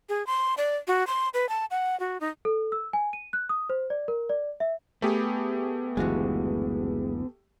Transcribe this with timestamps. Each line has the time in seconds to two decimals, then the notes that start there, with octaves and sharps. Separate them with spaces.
0.09 G#4
0.27 C6
0.58 D5
0.88 F#4
1.07 C6
1.34 B4
1.49 A5
1.71 F#5
2.00 F#4
2.20 D#4
2.45 A4
2.72 E6
2.93 G#5
3.13 D#7
3.33 F#6
3.49 D#6
3.70 C5
3.90 D5
4.08 A#4
4.29 D5
4.60 E5
5.02 A3 B3 G4 G#4
5.97 F#1 D2 E3 G#3 F4 F#4